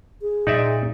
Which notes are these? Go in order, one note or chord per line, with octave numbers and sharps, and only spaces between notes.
G#4
A#2 D#4 D5 E5